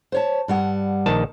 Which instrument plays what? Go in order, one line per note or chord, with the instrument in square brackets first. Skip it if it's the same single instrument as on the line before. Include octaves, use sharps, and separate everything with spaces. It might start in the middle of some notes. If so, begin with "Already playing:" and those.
[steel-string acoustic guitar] C5 C#5 A5
G2 G3 F#5
[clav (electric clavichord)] A#1 D#3 A5